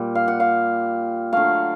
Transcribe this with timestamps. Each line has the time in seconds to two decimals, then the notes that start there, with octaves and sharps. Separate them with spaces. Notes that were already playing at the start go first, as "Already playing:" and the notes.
Already playing: A#2 G3
0.15 F5
0.28 F#5
0.40 F5
1.33 D3 F#3 A3 F5